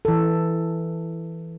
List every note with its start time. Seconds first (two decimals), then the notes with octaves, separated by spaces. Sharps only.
0.05 E3 A4